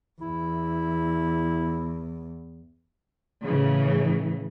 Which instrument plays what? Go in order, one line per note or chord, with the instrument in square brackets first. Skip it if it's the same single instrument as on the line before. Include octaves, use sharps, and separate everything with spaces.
[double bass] E2 [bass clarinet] E4
[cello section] A2 C#3 E3